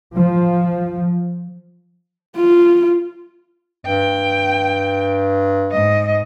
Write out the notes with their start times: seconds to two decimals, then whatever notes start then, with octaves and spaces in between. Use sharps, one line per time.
0.16 F3
2.36 F4
3.86 G2 G5
5.71 G#2 D#5